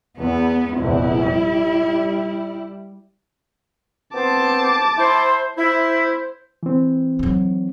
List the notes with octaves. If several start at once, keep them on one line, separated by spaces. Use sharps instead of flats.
E2 B3
F1 A#1 E2 E4
G3
B3 C4 C5 A5 D6
E4 C5
E4 C5
E3 C4
D#3 F#3